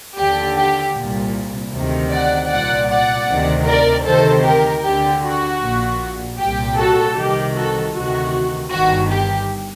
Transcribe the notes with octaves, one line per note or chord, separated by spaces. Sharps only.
D#2 D3 G4
G4
C2 A#2
D2 C3 D#3
D5 F#5
C2 A#2 D5 F#5
D5 F#5
D2 C3 D#3
A#4 D5
D2 C3 D#3 A4 C5
G4 A#4
D2 D3 G4
F#4
A#1 A#2
C2 A#2 G4
F#4 A4
C2 C3 D#3 G4
F#4 A4
D2 C3 D#3 F#4
G1 G2 D#3 F#4
G4